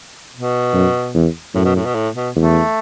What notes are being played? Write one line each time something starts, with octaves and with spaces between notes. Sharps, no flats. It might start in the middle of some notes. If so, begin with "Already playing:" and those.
B2
F#2
E2
F#2 A2
B2
A2
B2
A2
B2
E2 A3